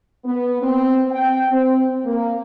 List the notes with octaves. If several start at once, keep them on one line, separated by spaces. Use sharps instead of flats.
B3
C4
G5
C4
A#3